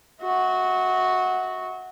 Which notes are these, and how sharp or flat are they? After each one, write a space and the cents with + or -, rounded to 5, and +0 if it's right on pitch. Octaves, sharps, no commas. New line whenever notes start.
F#4 -5 E5 -45